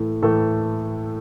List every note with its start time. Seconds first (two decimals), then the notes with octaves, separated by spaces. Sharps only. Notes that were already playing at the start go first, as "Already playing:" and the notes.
Already playing: A2 E3 A3
0.22 A2 E3 A3 A4